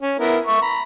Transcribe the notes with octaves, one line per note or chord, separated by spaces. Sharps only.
C#4
B3 E4 A#4
E5 C#6
A#5 B5